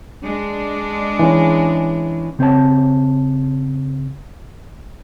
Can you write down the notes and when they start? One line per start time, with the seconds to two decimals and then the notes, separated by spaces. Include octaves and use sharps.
0.25 G#3 D4
1.19 E3 C#4
2.39 C#3 C4 C5 C#5 A5